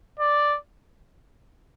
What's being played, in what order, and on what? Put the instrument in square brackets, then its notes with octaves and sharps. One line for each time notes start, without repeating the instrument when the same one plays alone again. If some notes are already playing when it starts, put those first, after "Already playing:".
[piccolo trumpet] D5